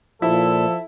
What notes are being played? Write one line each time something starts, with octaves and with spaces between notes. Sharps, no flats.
A#2 F3 E4 A4